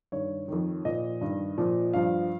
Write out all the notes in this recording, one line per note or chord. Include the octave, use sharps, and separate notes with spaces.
G2 D#3 C#5
F2 D#3
A#2 F3 D#5
G2 D#3
A#2 F3
G2 F3 F5